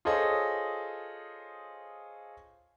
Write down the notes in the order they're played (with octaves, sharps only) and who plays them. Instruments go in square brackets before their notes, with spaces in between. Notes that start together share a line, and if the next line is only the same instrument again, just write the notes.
[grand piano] F4 G#4 A4 C5 C#5 D#5